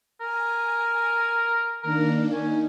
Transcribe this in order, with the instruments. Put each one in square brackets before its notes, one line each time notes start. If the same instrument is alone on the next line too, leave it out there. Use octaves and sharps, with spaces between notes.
[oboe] A#4 [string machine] G#5
[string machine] D#3 A#3 D4 [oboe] A#4
[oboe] C#4 [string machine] D#4